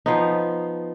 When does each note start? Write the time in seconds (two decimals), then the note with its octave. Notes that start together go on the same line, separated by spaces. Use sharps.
0.06 F3 B3 D#4